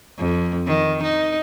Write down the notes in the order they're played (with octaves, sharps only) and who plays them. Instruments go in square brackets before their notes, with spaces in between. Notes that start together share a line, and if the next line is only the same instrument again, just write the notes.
[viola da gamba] F2
D#3
D#4